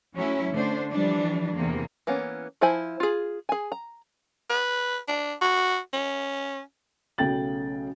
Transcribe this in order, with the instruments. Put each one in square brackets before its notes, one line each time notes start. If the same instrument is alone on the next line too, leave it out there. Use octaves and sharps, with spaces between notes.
[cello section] F#3 A3 C#4 E4
D3 A3 D4 C5
E3 F3 G3 D4
E2 C3 A#3
[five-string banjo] E3 A#3 B3 C#4
F3 E4 C5 G#5 B5
F4 G#4
G#4 G#5
A#5
[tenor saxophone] B4
D4
F#4
C#4
[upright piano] B1 C#3 A3 G5 A6 F#7